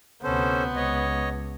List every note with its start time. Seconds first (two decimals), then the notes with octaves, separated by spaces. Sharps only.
0.24 D2 C3 B3 C#4 A4 C5
0.76 C#2 C#5 D#5